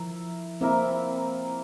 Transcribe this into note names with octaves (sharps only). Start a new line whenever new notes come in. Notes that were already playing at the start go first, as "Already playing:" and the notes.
Already playing: F3 E4 A#4
A#3 C4 E4 A#4 E5